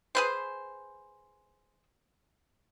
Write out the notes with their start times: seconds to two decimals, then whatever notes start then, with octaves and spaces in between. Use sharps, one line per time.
0.15 G#4 B4 C5